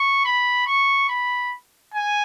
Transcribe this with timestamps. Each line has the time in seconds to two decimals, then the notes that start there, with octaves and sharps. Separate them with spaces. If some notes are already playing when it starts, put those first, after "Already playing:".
Already playing: C#6
0.25 B5
0.67 C#6
1.09 B5
1.94 G#5